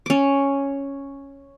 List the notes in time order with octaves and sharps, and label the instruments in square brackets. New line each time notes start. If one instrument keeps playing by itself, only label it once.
[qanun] C#4 D6